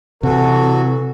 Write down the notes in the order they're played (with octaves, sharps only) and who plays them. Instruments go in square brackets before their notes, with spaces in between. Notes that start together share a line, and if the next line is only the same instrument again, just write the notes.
[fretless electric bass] C3 [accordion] E3 F#3 F#4 [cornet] A4